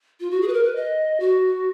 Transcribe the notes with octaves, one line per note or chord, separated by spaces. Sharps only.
F4
F#4
G#4
B4
A#4
B4
D#5
F#4